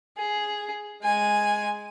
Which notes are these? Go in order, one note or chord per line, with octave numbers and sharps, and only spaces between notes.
G#4
G#3 G#5